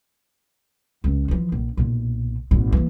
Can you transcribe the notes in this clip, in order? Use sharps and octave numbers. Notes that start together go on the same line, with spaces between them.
C#2
E3 F3
A#1
B1 A#2
G#1 A#2
E3 A#3